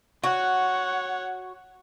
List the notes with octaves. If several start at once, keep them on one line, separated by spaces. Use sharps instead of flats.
F#4 C#5 F#5